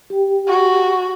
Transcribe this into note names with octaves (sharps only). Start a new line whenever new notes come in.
G4 G5
F#4